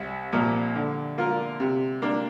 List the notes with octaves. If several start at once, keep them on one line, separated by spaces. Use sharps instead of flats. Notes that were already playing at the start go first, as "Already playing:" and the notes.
Already playing: C2
A#2 F3 A#3
D3
A#3 F4 A#4
C3
A#3 D4